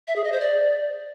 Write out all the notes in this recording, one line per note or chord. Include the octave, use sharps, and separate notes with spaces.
E5
G#4
D#5
C5
D5